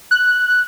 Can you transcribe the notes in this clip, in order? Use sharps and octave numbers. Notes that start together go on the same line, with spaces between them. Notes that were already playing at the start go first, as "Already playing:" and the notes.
F#6